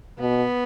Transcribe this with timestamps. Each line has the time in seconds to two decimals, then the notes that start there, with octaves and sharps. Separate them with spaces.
0.20 B2 B3